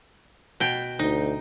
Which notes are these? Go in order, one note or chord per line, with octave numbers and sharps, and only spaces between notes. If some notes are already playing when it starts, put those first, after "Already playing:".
B2 G5
D2 D#4